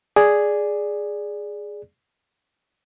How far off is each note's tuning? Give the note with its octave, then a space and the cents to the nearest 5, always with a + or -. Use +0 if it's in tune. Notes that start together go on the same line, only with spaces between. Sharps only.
G#4 +0 D5 +0